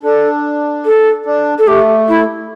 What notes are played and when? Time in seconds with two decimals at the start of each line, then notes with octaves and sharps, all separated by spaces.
0.03 D4 A4
0.85 A4
1.26 D4
1.58 A4
1.67 A3 G4
2.08 E4